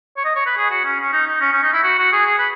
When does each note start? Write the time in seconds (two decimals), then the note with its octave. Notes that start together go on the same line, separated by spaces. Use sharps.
0.17 C#5
0.25 D#5
0.36 C#5
0.46 B4
0.57 G#4
0.70 F#4
0.85 C#4
1.00 C#4
1.13 D#4
1.27 D#4
1.41 C#4
1.52 C#4
1.63 D#4
1.73 E4
1.83 F#4
1.98 F#4
2.12 G#4
2.26 G#4
2.39 B4